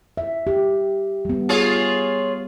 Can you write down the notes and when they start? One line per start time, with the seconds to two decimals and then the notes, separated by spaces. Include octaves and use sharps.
0.17 E5
0.47 G4
1.25 G3 B3
1.49 F4 G#4 C#5